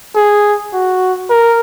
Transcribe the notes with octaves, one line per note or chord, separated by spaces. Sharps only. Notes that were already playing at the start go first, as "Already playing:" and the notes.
G#4
F#4
A#4